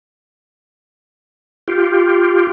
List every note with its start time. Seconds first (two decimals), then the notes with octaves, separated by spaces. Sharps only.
1.68 F4 G4